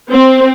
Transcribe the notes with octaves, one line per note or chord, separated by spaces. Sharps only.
C4